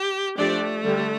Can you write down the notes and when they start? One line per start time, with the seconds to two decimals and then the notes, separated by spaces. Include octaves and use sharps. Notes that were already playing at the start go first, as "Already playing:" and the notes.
Already playing: G4
0.37 F3 A3 D4 G4 D5
0.83 D3 G3 D4 G4